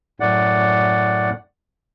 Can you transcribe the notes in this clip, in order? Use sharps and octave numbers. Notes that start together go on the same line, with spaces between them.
F#2 A2 D5 F#5